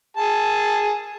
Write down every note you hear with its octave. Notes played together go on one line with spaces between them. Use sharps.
G#4 A5